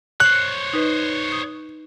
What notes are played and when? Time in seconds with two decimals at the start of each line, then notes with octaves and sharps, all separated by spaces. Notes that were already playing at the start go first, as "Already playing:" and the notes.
0.20 C5 C#5 F#6
0.73 D#4 B4 D#5
1.32 D#6